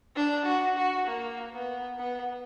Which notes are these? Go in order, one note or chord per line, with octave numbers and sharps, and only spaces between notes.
D4
F#4
F#4
A#3
B3
B3